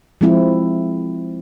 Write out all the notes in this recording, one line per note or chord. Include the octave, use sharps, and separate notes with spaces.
F3 G#3 C4 E4